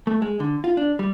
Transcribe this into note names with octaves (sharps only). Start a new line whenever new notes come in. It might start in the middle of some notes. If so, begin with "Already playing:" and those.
A3
G#3
D3
F4
D4
G3